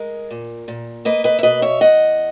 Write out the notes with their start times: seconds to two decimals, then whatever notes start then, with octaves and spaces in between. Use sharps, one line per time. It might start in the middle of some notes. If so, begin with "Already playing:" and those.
Already playing: G#3 A#4
0.31 A#2
0.68 A#2
1.05 A#3 B4 D#5
1.24 B4 D#5
1.39 E5
1.43 B2 B4 D#5
1.62 C#5 E5
1.81 E2 D#5 F#5